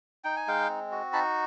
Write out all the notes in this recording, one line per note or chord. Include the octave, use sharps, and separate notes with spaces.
D#4 G5
G#5
G#3 F5 G5
C4
F#4
D#4 A5 B5